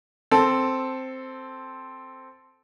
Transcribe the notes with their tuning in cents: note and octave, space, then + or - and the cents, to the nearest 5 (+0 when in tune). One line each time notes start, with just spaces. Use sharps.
C4 +0 A4 +0